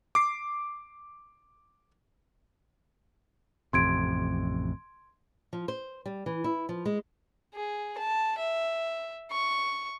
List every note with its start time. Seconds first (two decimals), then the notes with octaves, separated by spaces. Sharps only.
0.15 D6 C7
3.73 A1 F2 C3 C6 G#6 D7
5.53 F3
5.68 C5
6.06 G3
6.26 E3
6.44 E4
6.69 F3
6.85 G#3
7.55 G#4
7.98 A5
8.39 E5
9.32 C#6